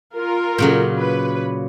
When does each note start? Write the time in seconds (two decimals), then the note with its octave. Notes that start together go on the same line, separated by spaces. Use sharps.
0.17 F4 A#4
0.58 A#2 C#3 F#3
0.99 B4